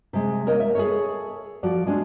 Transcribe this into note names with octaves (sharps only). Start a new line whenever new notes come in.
C3 G#3
A#3 A#4 C#5 D#5
E5
G#4 A4 C#5
F3 F#4 D5
G#3 C#4 D4